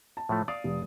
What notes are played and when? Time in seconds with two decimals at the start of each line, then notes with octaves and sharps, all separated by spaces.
0.17 A5
0.29 A2 F3 A3
0.48 D5 F5 D#6
0.64 F1